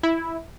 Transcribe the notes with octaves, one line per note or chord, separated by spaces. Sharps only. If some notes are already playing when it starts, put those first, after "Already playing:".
E4